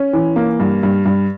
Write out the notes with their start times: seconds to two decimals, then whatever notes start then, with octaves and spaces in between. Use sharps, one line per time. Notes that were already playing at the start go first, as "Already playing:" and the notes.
Already playing: C#4
0.13 E3
0.36 A#3
0.60 G2
0.83 G2
1.06 G2